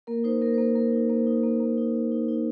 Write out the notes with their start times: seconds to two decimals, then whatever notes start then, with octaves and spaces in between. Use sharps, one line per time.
0.07 A#3 A#4
0.24 D#4 C5
0.41 A#3 A#4
0.54 C5
0.58 A#3 A#4
0.75 A#3 A#4
0.92 D#4
1.10 A#3 C5
1.27 D#4
1.43 A#3
1.60 A#3
1.78 D#4
1.95 D#4
2.12 D#4
2.28 D#4